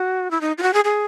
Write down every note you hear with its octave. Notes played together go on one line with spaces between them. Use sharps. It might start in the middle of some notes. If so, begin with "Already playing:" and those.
Already playing: F#4
E4
D#4
F4
F#4
G#4
G#4